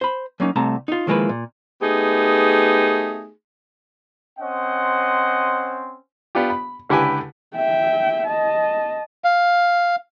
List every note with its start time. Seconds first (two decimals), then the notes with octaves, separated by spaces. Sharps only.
0.01 C5 B5
0.40 F#3 A#3 C#4 D#4
0.56 C2 C3 A3 A5 A#5
0.88 D#4 F4
1.07 D#3 F3 G#3 A#3 E4 B4
1.29 A#2
1.82 A3 B3 D#4 G4 G#4
4.39 C4 C#4 C5 D#5 F#5
6.35 B3 D4 F4 G4
6.50 B5
6.89 C#2 D3 E4 G4 B4 G#5
7.56 E5 G5
8.27 D#5 A5
9.24 F5